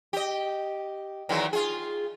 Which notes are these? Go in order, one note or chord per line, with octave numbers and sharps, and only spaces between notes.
G4 D#5
E2 D#3 F#3
F4 G#4